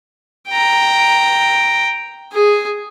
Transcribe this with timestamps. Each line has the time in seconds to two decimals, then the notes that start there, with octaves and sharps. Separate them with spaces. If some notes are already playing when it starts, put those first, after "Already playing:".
0.49 G5 A#5
2.33 G#4